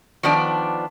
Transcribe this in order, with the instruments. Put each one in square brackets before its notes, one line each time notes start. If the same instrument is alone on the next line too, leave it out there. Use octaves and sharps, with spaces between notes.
[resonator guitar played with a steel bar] D#3 F3 B3 D4 D5